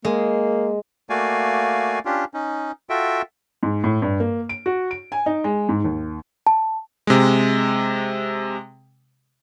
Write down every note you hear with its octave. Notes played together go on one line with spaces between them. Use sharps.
G#3 A#3
A3 A#3 F#4 D5 F5 G#5
C#4 D4 F4 G4
C#4 D#4
F4 F#4 A4 E5 G5
G#2
A2
G2
A#3
D7
F#4
D7
G#5
D#4
G#3
G#2
D#2
A5
C3 G#3